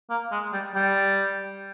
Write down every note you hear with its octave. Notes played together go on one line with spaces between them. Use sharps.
A#3
G#3
G3
G3